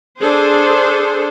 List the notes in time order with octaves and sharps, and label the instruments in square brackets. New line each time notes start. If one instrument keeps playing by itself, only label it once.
[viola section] D4 G#4 A4 C5